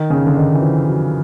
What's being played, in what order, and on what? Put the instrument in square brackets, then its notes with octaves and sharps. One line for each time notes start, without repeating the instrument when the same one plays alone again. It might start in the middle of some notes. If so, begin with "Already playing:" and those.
Already playing: [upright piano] D#3
C#3
D3
D#3
E3
F3
F#3